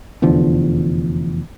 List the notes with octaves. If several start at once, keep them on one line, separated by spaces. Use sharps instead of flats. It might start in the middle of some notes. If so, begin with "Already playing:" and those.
F1 E2 D3 F3